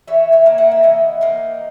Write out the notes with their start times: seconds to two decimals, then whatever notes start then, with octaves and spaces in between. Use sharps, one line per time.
0.07 E3 C#5 E5
0.32 C#5 E5
0.46 A#3 D#4
0.58 F#5
0.71 E5
0.83 E3 D#5 F#5
1.21 A#3 D#4